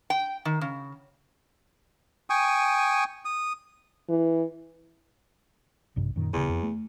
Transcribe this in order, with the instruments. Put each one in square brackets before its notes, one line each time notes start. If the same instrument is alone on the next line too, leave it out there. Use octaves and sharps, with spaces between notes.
[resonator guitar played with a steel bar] G5
D#3
C#3
[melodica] G5 G#5 C#6 D#6
D#6
[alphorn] E3
[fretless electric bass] A#1 G2 C3
F#2 A#2 D#3
[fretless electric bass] D#1 C#3 [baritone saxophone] E2
[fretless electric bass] F2
A3